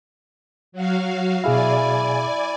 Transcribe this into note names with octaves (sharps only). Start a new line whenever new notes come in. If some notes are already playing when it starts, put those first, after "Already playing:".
F#3 F#4 F5
B2 E4 G#4 D5 F5 G#5